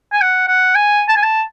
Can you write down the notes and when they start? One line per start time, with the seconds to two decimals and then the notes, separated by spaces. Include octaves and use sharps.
0.12 G#5
0.21 F#5
0.48 F#5
0.75 G#5
1.09 A5
1.16 G#5
1.23 A5